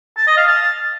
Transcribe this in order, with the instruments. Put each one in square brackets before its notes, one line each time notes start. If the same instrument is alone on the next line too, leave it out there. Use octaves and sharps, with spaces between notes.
[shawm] A5
D#5
F5
A5